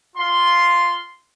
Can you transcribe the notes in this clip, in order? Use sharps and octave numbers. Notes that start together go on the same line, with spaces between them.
F4 C6